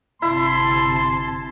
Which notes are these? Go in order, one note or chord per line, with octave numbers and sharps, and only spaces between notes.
G1 C3 E4 A5 C6